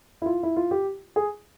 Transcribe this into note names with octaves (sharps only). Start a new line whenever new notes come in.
E4
F4
E4
F4
G4
G#4